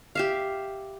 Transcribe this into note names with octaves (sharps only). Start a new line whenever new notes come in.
G4 E5 F5